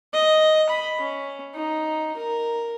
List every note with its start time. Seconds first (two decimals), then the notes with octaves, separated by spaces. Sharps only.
0.13 D#5
0.70 B5
1.01 C#4
1.55 D#4
2.16 A#4